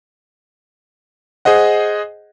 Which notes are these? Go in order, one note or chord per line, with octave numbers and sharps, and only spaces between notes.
G#4 C5 D#5 F#5